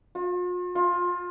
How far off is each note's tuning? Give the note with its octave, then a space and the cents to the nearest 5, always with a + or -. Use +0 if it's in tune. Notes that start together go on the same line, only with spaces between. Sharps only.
F4 +45
F4 +20